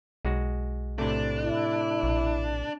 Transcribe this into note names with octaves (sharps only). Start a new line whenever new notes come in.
B1 G#3 F#4
A2 C3 A3 D4
E4
A#1